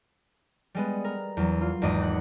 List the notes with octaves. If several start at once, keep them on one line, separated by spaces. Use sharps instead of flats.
G3 G#3 B3
A#4
E2 F#3
F4
G#1 E2 G#2 D#5 D6
F#5 F#6